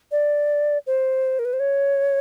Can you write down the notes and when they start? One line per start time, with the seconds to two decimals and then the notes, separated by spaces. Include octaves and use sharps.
0.12 D5
0.87 C5
1.39 A#4
1.45 B4
1.53 C5
1.60 C#5